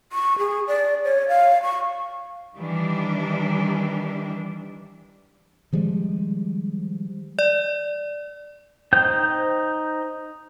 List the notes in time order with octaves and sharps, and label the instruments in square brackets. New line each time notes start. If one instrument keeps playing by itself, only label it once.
[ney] C#6
G#4
D5
C#5
F5
C#6
[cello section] D#3 E3 G3 D4
[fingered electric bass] D#3 F3 G3 G#3
[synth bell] D5
[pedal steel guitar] D#4 C5 G5 G6